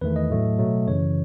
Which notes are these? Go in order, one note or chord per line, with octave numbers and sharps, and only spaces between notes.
E2 D#3 A3 B4
D#5
A2 F#3 A3
B2 F#3 A3
F#2 C#3 E3 C#5